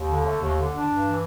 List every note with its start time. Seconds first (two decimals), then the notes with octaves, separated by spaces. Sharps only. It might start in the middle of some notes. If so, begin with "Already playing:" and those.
Already playing: D#2
0.09 D3
0.25 A3
0.40 D#2
0.57 D3
0.72 D4
0.88 G2
1.04 E3